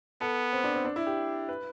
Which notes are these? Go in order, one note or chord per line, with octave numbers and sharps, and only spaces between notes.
B3 A4
C4
D4
C4
D4
E4
G4
B4